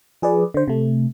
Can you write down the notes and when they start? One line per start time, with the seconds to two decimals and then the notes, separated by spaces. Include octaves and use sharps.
0.22 F3 G#4 B4 D5
0.54 D3 C5
0.68 C3 A3